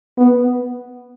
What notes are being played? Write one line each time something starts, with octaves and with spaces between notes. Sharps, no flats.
B3